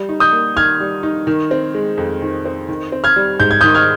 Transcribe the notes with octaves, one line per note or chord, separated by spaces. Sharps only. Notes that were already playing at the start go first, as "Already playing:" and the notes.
Already playing: G3
D#4
D#6 G6
A#3
D#3 F6 G#6
G3
D#4
D#3
C4
G#3
F2
D#3
C4
D#3
C4
F6 G#6
G3
G#2 G6
G#6
D#3 D#6 G6
F6 G#6